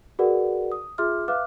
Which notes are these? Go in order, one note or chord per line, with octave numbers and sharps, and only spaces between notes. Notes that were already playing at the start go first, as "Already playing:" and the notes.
F#4 G#4 A#4 B4 D5 F#5
D#6
F4 G#4 E5 C6 D6 F6
B4 E5 F5 D6 F6 F#6